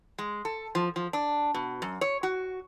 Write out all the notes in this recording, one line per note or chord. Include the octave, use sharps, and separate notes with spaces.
G#3
A4
F3
F3
D4
B2
F#2
C#5
F#4